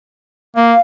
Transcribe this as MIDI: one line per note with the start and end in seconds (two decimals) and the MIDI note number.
0.57 0.74 58
0.57 0.80 77